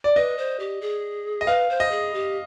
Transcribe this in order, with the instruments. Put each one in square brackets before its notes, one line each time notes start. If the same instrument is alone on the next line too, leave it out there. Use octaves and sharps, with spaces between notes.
[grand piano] D5
[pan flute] B4 [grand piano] D#5
[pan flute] C5
G4
G#4
[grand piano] D#5
[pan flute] B4 [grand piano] F5
[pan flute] C5
[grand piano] D#5
[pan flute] G#4
G4